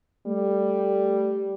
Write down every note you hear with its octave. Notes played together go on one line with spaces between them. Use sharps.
G3 A3